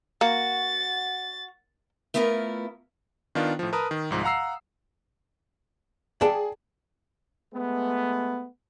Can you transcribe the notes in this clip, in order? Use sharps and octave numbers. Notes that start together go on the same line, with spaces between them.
A#3 F#4 A6
A3 B3 E4 F4 G4 A#4
D#3 B3 D4 F4
A2 F3
A#4 B4 A5 A#5 D#6
D#3
C2 G#2 F3
F5 F#5 A#5 E6 C7
G#4 D5 G5 A5
G#3 A3 B3